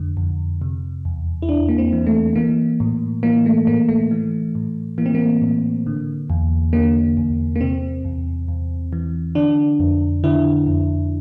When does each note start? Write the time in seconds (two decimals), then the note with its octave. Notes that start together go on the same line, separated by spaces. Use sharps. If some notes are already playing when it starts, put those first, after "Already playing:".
Already playing: F2 D3
0.17 F2
0.61 C3
1.05 E2
1.42 E4
1.49 E2 D4
1.69 A#3
1.78 C4
1.93 E3
2.07 A3
2.36 E3 A#3
2.80 A2
3.23 E3 A#3
3.46 A3
3.67 A2 A#3
3.89 A3
4.11 E3
4.55 A2
4.98 E3 A#3
5.06 C4
5.15 A#3
5.42 A2
5.86 D3
6.30 E2
6.73 D3 A#3
7.17 E2
7.56 A#3
7.61 C3 C4
8.05 E2
8.48 E2
8.93 E3
9.35 D3 D4
9.80 F2
10.24 D3 E4
10.67 F2